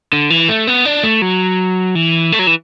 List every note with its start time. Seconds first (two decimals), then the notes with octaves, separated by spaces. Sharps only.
0.13 D3
0.30 E3
0.49 A3
0.67 B3
0.85 D4
1.04 A3
1.22 F#3
1.95 E3
2.32 A3
2.39 F#3
2.47 E3